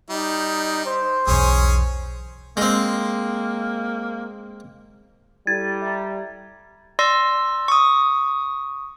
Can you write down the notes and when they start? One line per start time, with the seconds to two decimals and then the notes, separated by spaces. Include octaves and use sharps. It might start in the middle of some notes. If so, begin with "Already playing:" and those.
0.10 G3 D#4
0.86 C5
1.27 B1 E2 C#4 G#4
2.57 G#3 A#3 C4
5.47 G3 E4 A4 G#6 A6
5.82 E5 A#5
6.99 D5 C6 E6 A#6
7.68 C#6 D#6